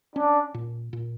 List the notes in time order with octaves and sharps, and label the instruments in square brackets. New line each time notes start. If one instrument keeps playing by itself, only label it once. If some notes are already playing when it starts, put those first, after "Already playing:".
[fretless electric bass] C#4 [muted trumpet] D4
[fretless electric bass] A#2
A#2